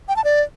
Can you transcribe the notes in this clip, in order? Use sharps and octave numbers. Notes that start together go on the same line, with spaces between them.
G5
A5
D5